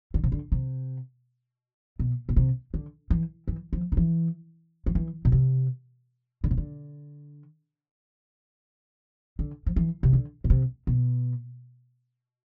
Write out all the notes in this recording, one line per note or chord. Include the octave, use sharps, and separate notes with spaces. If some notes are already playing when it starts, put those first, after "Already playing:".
D3
C3
D3
C3
B2
B2
C3
D3
E3
E3
F3
D3
E3
F3
E3
B2
C3
D3
C3
D3
D3
F3
E3
C3
D3
B2
C3
B2